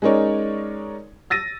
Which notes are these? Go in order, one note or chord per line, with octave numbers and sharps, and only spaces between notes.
G#3 C#4 D#4 A#4 C#5 D5
E6 A6 A#6 D#7